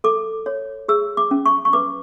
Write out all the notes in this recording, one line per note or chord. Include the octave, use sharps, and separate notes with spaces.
A4 D6
C#5
G#4 E6
D6
C#4
C#6
C#6
B4 D6